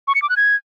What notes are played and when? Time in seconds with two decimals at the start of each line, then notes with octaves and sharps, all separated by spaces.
0.07 C#6
0.15 C#7
0.22 D6
0.29 F#6
0.37 G#6